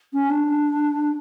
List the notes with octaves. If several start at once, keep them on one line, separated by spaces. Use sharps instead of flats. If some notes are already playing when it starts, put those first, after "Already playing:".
C#4
D4